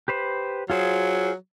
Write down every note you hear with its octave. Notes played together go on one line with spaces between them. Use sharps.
G4 B4 C5
F#3 F4 G#4 C5